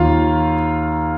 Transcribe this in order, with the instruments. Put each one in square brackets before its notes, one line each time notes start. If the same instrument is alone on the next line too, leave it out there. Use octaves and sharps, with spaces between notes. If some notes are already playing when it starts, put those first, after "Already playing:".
Already playing: [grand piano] D#2 D#3 A#3 F4 F5